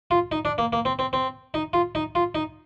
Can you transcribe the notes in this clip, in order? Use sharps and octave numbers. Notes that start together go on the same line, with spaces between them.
F4
D#4
D4
A#3
A#3
C4
C4
C4
D#4
F4
D#4
F4
D#4